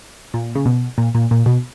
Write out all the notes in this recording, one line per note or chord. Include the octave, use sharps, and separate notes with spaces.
A#2
C#3
B2
A#2
A#2
A#2
B2